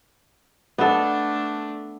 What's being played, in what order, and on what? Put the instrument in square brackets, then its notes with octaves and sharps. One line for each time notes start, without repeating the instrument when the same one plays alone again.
[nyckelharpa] A3 D4 [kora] B3 A4